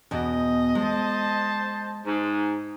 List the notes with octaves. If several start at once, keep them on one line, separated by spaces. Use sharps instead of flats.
E2 B2 D#5
G#3 C5 A5
G#2